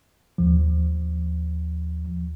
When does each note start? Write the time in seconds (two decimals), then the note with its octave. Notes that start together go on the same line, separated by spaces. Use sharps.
0.38 D#2 F3